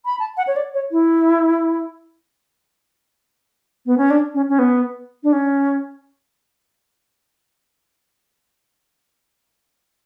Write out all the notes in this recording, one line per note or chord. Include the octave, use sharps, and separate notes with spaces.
B5
A5
F#5
C#5
D5
C#5
E4
B3
C#4
D4
C#4
C#4
B3
D4
C#4